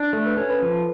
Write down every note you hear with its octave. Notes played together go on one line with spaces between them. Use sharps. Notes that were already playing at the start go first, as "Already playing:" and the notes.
Already playing: D4
A3 A4
B4
C#4 A4
B4
F3